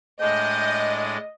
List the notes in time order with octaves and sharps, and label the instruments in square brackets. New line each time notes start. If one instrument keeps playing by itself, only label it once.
[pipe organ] A2 G#3 D4 [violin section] D#5 [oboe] G5